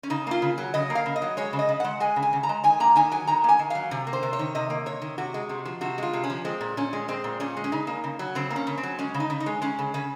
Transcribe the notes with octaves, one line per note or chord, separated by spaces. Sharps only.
C#4
C#3 D#4
A#3 F4
C#3
F#3
C#3 D#5
A#3
F5
C#3
D#5
F#3
G#3 C#5
C#3
D#5
C#3
G#3 F#5
G#3 G#5
C#3
G#5
C#3
A#5
G#3
D#3 G#5
A#3 A#5
D#3 G#5
F#3 G#5
D#3 A#5
A#3 G#5
D#3
F#3 F5
C3
A#3
C5
C3
C#5
D#3
C3 D#5
A#3
C3 C#5
D#3
C3 F#4
G#3
C3
F3
C3 F#4
G#3 F4
C3
C#4
F3
G#3 C4
A#2
A#2 C#4
G#3
G#3 C4
A#2
A#2 C#4
G#3
C#4
C#3 D#4
A#3
C#3
F#3
C#3 C4
A#3
C#4
C#3
C4
F#3
G#3 C#4
C#3
D#4
C#3
D#4
G#3
G#3 C#4
C#3
C#3 C#4